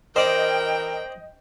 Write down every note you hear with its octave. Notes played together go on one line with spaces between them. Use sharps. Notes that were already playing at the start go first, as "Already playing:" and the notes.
E3 C4 A#4 C5 D5 D#5 G5 A#5